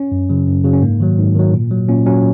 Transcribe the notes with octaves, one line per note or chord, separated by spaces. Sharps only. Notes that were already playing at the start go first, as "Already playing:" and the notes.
Already playing: C#4
F#2
C#3 F#3
F#2
C#3 F#3
C#4
G#2 A#3
D#3 F#3
G#2
D#3 F#3
A#2
F#3
A#2 C#4
F#3 C#4